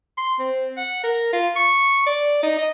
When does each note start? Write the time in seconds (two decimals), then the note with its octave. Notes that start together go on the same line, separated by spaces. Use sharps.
0.17 C6
0.39 C4
0.77 F#5
1.03 A#4
1.33 F4
1.56 C#6
2.06 D5
2.43 D#4
2.58 D#5